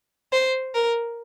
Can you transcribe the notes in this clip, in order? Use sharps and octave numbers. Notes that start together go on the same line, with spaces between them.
C5
A#4